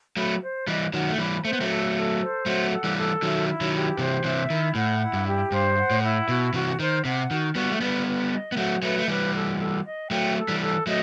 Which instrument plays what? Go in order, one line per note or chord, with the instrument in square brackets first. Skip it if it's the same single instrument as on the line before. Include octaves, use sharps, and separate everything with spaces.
[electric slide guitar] F#3 A3 [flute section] B5
[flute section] C5
[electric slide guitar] E3 G3 [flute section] D#5
[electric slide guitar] D#3 F#3 [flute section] F#5
[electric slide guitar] A3
[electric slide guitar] E3 G3 [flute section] B5
[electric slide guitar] A3 [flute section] C5
[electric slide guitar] B3
F#3 A3
[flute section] A4
A4
C5
[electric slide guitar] F#3 A3 [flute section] F#5
[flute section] A4
[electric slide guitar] E3 G3
[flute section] A4
[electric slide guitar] D#3 F#3 [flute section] E5
[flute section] E4
[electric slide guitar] D#3 F#3
[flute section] G4
[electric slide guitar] C3 E3 [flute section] C5
[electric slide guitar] C3 E3 [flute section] E5
[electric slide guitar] D#3 [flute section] E4
[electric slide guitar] A2 [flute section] F#5
[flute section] E4
[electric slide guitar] G2
[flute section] G4
[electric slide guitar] G2 [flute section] C5
[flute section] F#5
[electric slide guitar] A2
[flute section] E4
[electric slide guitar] B2 [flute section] F#4
[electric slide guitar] C3 E3 [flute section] F#4
[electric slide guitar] D#3 [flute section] C5
[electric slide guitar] C3 [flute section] F#5
[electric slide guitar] D#3 [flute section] F#4
[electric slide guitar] G3 B3 [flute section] F#4
[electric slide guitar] A3
[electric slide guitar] G3 B3 [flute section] B4
[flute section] B4
D#5
[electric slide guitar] B3
[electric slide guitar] F#3 A3 [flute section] F#5
[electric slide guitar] F#3 A3 [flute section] B4
[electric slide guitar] A3
[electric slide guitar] E3 G3 [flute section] B4
[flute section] A4
A4
D#5
[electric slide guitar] F#3 A3 [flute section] G5
[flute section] A4
[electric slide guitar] E3 G3
[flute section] A4
[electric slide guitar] F#3 A3 [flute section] D#5